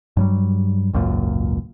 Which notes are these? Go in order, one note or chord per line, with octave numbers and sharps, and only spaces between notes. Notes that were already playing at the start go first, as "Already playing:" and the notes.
G2 F#3 G3
G#1 C#2 F#2 A#2